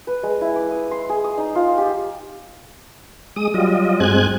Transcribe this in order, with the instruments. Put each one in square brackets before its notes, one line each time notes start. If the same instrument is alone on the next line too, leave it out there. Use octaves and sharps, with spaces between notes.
[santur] B4
G#3
E4
D6
D#6
C6
G#4
D#6
D#4
F4
G4
[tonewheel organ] G#3 D#6
F#3 G3 F4 D#5
G2 G#3 C4 G#5 F#6 G#6